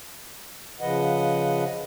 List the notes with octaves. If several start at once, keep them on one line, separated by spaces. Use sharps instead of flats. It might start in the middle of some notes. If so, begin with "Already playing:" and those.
C#3 F3 B4 D#5 F#5